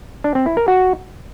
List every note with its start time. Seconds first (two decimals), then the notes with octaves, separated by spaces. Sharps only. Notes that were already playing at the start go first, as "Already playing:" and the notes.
0.24 D4
0.35 C4
0.46 E4
0.57 A#4
0.68 F#4